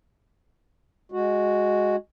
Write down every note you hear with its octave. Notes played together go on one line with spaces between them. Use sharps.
G#3 F#4